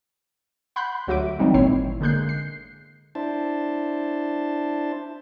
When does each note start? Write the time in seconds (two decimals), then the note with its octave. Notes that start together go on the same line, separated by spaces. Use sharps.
0.76 F#5 B5 C6 F#6 G6 C7
1.07 D2 F#3 F#4 E5 D6 D7
1.39 D#3 E3 F#3 G3 C4 D#4
1.54 G#1 A#2 C4 E4 C#5 C7
2.01 D3 G#3 A#3 F#6 G6 C7
2.29 C7
3.15 D4 E4 C5 A5